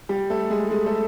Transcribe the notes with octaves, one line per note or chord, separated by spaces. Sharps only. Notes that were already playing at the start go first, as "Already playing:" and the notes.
G3 G4
A3 A4
G#3 G#4
G#3 G#4
A3 A4